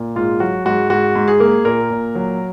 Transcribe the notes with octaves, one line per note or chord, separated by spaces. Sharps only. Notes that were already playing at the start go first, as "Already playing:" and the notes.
Already playing: A#2
G#2 F4
F#3 F#4
G#2 F#4
G#2 F#4
G#2
G#4
A#3
A#2 A#4
A#2
F#3